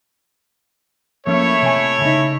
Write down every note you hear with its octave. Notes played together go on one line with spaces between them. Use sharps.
F3 A3 A#3 C#4 E4 C#5
C3 G#5
C#3 D#4